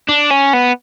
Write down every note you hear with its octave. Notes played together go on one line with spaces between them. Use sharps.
D4
C#4
B3